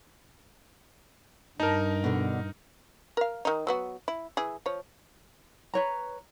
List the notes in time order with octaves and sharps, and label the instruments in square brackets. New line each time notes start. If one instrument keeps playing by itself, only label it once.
[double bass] G2 [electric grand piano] D#4 A#4 [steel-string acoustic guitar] A5
[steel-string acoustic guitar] B2 D3
[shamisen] A#4 F5
D#3 D#4
F#3 B3 F#4
E4
E3 E4 G#4
F3 C#5
[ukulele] B4 C#5 A#5